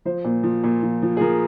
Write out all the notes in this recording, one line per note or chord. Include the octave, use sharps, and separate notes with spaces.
F3 C5
A#2
F3
A#2
F3
F3
G#4
F3 A#4